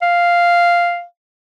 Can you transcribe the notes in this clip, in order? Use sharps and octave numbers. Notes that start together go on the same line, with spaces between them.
F5